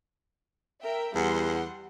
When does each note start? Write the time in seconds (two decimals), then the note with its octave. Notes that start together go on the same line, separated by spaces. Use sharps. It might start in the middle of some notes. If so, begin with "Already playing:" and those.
0.81 A#4 E5 G5
1.15 E2 G3 F#5 C6